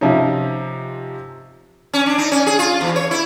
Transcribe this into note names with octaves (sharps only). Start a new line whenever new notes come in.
C3 F3 C#4 D#4
C#4
D4
D#4
C#4
G#4
F4
E2
C#5
E4